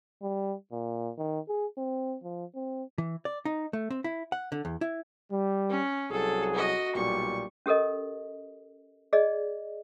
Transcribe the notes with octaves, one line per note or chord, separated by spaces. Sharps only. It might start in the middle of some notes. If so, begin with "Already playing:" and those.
G3
A#2
D#3
G#4
C4
F3
C4
E3
D5
D#4
A3
C4
E4
F#5
D3
E2
E4
G3
C#4
C2 F#3 G#4 A4
F#4 D#5
B1 A#2 G3 C#6
C#4 G4 A4 A#4 D#5
G#4 D5 D#5